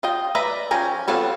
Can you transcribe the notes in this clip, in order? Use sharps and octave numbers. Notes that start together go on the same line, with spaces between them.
F4 D#5 G5
B4 D5 E5 A#5
F3 C#4 G5 G#5 A#5
B3 C4 F4 A4 C#5